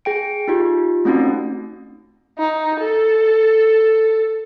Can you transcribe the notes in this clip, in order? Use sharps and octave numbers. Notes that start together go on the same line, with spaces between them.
G#4 G5 D7
D#4 F4 G4
A3 C4 C#4 D#4 F#4
D#4
A4